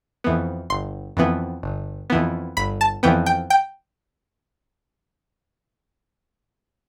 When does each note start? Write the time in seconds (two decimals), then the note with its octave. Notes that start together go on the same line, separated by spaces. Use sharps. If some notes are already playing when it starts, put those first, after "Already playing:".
0.24 F2 E3 B3
0.70 G1 C6
1.17 F2 E3 B3
1.63 G1
2.10 F2 E3 B3
2.57 G1 B5
2.81 A5
3.03 F2 E3 B3 G5
3.26 G5
3.50 G5